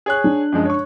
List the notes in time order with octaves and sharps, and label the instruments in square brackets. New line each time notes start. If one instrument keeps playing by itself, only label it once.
[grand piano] G#4 C#5 F#6
[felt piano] D4
[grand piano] F#2 F3 G#3
C#5 C#6